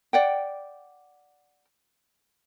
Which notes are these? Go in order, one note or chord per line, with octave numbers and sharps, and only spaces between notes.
D5 F#5 G5